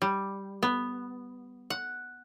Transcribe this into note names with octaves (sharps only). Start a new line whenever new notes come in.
G3
B3
F#5